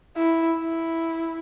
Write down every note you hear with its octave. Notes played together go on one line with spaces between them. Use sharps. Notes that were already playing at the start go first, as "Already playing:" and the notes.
E4
E4